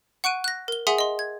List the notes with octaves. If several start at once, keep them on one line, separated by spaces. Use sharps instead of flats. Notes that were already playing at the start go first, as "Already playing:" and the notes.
F#5 C#6 F#6 D7 D#7
F#6 A#6
A#4 G7
G#4 E5 F#5 G#5 C6 D#6
D#5 C6
G#6